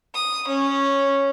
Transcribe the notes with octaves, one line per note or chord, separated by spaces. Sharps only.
D#6
C#4